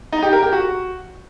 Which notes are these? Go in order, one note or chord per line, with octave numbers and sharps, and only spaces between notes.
D#4
G4
A#4
G4
F#4